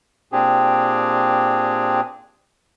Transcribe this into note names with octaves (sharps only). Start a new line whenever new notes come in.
A#2 C4 D4 G4 G#4